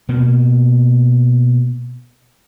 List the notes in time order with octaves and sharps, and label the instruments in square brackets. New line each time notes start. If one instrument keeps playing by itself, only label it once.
[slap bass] B2 A#3